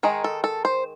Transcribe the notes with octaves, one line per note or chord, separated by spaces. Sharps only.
D#3 G#3 D#4 G#4
A4
A4
C5